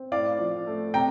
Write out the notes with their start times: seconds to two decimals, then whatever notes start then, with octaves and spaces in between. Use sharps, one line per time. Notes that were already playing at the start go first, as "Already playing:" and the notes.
Already playing: C4
0.12 A2 D5 F5
0.39 F3
0.67 A3
0.94 C3 G5 A#5